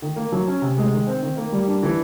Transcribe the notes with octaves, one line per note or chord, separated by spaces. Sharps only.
D#3
A#3
F#3
C#4
C3
G#3
D#3
C4
D#3
A#3
G3
D4
E3